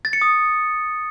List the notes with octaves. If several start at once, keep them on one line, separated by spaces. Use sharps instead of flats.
A6
C#7
D#6